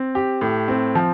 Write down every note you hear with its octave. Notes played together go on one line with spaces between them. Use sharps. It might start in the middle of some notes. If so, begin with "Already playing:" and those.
Already playing: C4
G4
A2
C4
F3